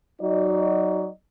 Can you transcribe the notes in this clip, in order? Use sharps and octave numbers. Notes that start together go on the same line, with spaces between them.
F#3 D#4 F#4 D5 D#5